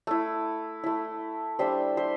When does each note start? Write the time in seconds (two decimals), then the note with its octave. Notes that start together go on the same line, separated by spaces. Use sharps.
0.07 A3 E4
0.84 A3 E4
1.59 G3 D4 C5 E5
1.97 C5 E5